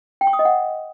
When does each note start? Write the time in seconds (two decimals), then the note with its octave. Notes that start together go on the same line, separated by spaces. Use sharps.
0.21 G5
0.27 C#6
0.33 D#6
0.39 D#5
0.45 F#5